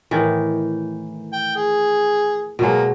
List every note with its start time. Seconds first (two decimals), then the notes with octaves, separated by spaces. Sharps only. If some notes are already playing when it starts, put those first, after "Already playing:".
0.11 A2 D#3 E3
1.33 G5
1.55 G#4
2.59 B2 F#3 G#3 A#3